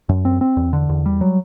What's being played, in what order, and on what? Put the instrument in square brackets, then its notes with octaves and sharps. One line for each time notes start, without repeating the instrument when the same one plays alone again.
[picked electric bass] F#2
C4
C4
E2
D3
E2
G3
F#3